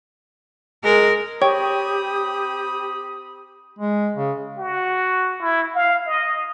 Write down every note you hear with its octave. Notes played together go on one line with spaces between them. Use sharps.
G#3 A#4
C4 G4 C#5 G5 B5 D#6
G#3
C#3
F#4
E4
F5
D#5